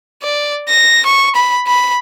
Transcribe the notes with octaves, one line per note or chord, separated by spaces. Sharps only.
D5
A#6
C#6
B5
B5